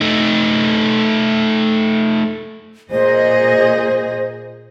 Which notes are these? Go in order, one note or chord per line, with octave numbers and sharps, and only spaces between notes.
A3 D#4
A#2 G#4 C5 D#5